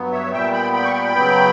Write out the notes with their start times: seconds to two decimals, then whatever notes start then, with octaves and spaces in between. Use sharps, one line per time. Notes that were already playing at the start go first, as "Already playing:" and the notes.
Already playing: G2 F#3 B3
0.12 C#5 E5
0.32 A#2 G3 B3 E5 G5
0.52 G5 B5
0.73 G5 B5
0.85 C#6
0.93 G5 B5
1.13 C#3 F#3 B3